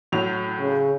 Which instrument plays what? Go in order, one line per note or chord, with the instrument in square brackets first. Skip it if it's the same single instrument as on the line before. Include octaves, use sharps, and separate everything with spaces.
[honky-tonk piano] A2 F#3 F7
[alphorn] C#3